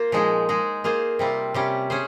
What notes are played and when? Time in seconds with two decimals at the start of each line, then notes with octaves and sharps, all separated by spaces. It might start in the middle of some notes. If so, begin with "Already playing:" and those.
Already playing: A#3 F4 C5
0.12 A#2 F3 G#3 D#4 G#4
0.49 G#3 D#4 G#4
0.84 A#3 F4 G#4 C5
1.19 C3 G3 C4 F4
1.54 C3 G3 C#4 G4
1.90 C#4 G#4 C5